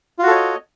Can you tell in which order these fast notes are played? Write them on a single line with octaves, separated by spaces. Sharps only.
F4 F#4 A4 C#5 D#5